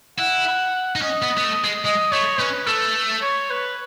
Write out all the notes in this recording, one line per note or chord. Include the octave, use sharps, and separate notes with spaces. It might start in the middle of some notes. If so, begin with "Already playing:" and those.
E4 F#5
D#4
C#4 D#5
B3
B3
A3
G#3
G#3 D#5
A3 C#5
C#4 B4
A3 A4
C#5
B4